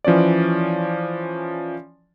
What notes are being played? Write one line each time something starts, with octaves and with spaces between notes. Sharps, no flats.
E3 F3 C#4 C#5 D5